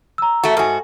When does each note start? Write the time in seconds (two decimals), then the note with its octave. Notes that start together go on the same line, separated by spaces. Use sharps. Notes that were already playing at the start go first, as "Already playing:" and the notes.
0.18 A#5 E6
0.44 A3 F#4
0.57 G#2 F#4 A4 G#5